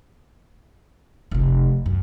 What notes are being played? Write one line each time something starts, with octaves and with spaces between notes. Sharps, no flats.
F1 C3
F#2